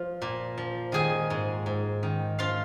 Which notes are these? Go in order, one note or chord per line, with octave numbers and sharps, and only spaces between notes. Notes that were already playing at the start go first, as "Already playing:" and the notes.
Already playing: F3 F4
A#2
F3
D#3 G#4 G#5
G#2
G#2
D#3
F3 F4 F5